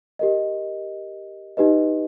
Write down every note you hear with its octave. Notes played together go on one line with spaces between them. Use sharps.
G4 A#4 D#5
D#4 G4 B4 D#5